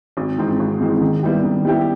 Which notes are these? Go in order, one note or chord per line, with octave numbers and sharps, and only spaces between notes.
G#1
G#2 E3 G#3 C4
G#1
G#2 E3 G#3 C4
D#3
G3 B3 E4 G4
D#3
G3 B3 E4 G4